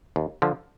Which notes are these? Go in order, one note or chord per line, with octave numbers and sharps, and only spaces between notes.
D#2
D3 F3